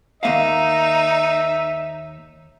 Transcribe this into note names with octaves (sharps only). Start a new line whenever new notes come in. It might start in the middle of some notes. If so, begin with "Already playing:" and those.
D#2 A#3 D#4 E5 F5